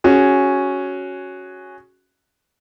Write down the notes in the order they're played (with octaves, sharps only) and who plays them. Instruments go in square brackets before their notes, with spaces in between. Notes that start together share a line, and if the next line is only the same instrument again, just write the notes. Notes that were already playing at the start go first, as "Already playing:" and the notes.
[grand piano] C#4 F#4 G#4